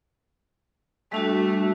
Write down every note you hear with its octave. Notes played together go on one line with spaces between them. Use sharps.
G3 A3 D4 F#4